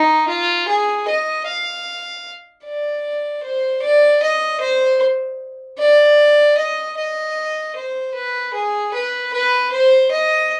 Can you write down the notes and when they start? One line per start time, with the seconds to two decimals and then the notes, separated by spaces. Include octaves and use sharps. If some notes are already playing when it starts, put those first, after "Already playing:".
Already playing: D#4
0.28 F4
0.68 G#4
1.08 D#5
1.46 F5
2.65 D5
3.43 C5
3.82 D5
4.22 D#5
4.60 C5
5.78 D5
6.57 D#5
6.98 D#5
7.76 C5
8.15 B4
8.54 G#4
8.94 B4
9.33 B4
9.72 C5
10.11 D#5